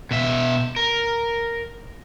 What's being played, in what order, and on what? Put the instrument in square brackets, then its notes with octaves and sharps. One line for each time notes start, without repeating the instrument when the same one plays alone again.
[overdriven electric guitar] B2 E5
A#4